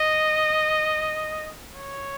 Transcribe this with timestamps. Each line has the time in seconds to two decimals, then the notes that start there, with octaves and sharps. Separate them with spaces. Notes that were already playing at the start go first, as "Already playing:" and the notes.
Already playing: D#5
1.74 C#5